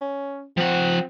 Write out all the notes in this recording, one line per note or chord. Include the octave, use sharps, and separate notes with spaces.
C#4
F3 C4 F#5